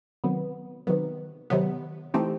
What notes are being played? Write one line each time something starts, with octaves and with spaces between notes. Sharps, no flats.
C3 D#3 F#3 B3
C3 D#3 F#3 B3
C3 D#3 F#3 B3
E3 A3 C4 D#4 G4